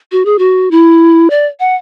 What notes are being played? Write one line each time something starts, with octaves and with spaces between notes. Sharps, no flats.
F#4
G#4
F#4
E4
D5
F#5